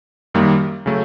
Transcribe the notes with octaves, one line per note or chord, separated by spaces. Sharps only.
F#2 D#3 G3 A#3
C#3 F#3 A3